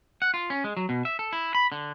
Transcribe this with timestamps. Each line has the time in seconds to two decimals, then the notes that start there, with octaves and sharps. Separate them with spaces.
0.22 F#5
0.34 F4
0.50 C#4
0.64 G#3
0.77 F#3
0.89 B2
1.05 E5
1.19 A4
1.33 E4
1.55 B5
1.72 D3